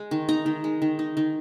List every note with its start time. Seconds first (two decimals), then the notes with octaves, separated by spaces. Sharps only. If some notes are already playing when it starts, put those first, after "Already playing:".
Already playing: G#3
0.11 D#3
0.29 D#4 A#5
0.46 D#3
0.64 G#3
0.82 D#3
0.99 D#4
1.17 D#3